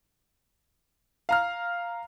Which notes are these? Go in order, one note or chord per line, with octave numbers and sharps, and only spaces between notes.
F5 A#5 F6